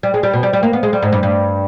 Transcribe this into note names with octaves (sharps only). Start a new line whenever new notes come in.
G3
G#3
G3
B2
G3
G3
A#3
B3
G#3
G3
G#2
G2
G2